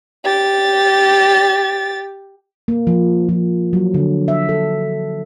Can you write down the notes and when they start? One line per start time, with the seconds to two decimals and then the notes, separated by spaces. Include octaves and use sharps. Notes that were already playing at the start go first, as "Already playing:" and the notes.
0.24 G4 A6
2.68 A#3
2.87 F3
3.29 F3
3.73 F#3
3.94 D3
4.28 E5
4.49 A4